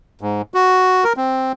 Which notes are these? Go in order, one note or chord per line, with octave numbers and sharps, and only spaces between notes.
G#2
F#4
A#4
C4